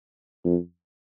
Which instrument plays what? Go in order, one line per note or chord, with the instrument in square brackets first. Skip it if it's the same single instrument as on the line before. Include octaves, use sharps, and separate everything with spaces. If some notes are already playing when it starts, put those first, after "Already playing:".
[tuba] F2